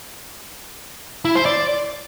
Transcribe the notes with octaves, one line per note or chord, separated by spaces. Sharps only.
E4
C5
D5